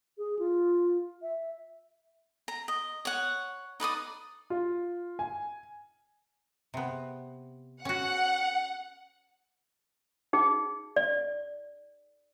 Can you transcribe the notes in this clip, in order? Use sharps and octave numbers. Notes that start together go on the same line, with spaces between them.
G#4
F4
E5
A#5
D#5
C#5 F#5
D#4 B4 D5 D#6
F4
G#5
C3 B3
C#4 F#4 F#5
D#4 G#4
D5